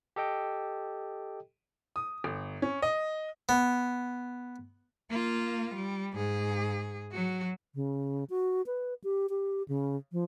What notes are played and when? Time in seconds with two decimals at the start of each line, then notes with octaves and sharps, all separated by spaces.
0.16 G4 A4 D#5 G5
1.96 D#6
2.24 G1
2.62 C#4
2.82 D#5
3.49 B3
5.11 A#3 F4
5.75 G3
6.15 G#2 G#4
7.12 F#3 F#4
7.75 C#3
8.30 F#4
8.67 B4
9.04 G4
9.30 G4
9.68 C#3
10.12 F3